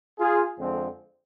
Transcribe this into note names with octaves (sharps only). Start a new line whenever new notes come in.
F4 G#4
F2 D3 F3 G#3 C4